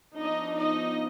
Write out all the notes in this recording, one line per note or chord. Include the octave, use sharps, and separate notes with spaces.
F3 B3 D4 D#4 D#5
D#4 D#5